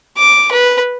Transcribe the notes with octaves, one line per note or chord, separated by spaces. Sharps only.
D6
B4